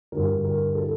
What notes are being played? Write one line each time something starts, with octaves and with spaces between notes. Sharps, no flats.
G2 D3 A#4
A#4
A4